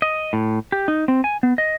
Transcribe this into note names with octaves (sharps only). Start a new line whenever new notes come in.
D#5
A2
G4
D#4
C4
G#5
B3
D#5